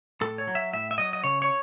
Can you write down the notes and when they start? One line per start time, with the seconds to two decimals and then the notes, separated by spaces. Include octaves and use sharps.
0.21 A2 A4
0.38 C#5
0.47 F#3
0.55 E5
0.73 A2 E5
0.91 E5
0.98 F#3 D#5
1.13 D#5
1.24 C#3 C#5
1.42 C#5